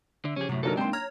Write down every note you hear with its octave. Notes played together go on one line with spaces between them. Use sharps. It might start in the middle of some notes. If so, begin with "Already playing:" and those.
D3 E5
C#3 F3 C#4 G4 G#4
F#2 A2 C3 F#4
G1 F#3 A#3 D4 D#4 A4 A#4
G#3 C4 G5 C6
C#5 A#5 F6